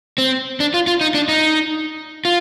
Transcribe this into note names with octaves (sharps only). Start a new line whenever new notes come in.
C4
D4
F4
F4
D#4
D4
D#4
F4